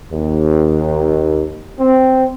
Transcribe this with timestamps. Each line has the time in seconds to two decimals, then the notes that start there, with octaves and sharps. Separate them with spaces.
0.13 D#2
1.80 C4